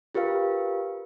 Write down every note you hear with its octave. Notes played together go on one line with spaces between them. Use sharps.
F4 G4 A#4 B4 F5